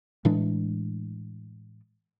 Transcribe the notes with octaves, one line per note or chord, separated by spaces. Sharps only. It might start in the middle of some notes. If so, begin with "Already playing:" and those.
A2 E3 G#3 D4